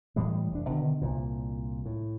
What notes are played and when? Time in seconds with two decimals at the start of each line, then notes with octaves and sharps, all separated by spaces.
0.16 A2 E3 G3 G#3
0.52 F1 D4
0.69 B2 D3 D#3
1.02 C2 A#2
1.86 A2